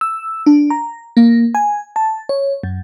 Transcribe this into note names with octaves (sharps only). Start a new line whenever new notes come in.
E6
D4
A#5
A#3
G#5
A5
C#5
F#2